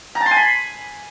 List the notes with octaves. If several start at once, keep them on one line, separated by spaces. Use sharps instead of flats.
A#5
A5
C6
G#5
B5